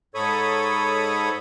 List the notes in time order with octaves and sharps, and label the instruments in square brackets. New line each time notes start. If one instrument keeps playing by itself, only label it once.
[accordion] G#2 A4 C#5 B5 C#6 D#6